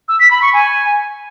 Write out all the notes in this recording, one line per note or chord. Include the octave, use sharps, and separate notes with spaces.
E6
B6
B5
C#6
G#5